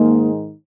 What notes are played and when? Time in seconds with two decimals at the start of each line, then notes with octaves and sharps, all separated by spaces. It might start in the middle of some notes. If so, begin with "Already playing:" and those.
Already playing: G#2 D#3 G#3 A#3 D#4